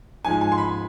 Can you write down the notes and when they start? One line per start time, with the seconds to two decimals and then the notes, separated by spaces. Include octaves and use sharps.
0.25 G#2 F3 G#3 G#5
0.41 G#5
0.52 C6
0.58 B5